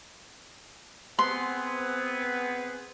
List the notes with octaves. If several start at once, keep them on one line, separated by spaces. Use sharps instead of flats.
B3 C4 G#4 C6